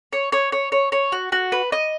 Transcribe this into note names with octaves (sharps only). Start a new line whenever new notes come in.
C#5
C#5
C#5
C#5
C#5
F#4
F#4
B4
D#5